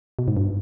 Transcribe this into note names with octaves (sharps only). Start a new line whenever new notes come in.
B2
G#2
G2